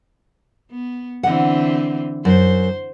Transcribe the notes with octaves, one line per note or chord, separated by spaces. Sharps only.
B3
D3 E3 C4 F#5
F#2 C5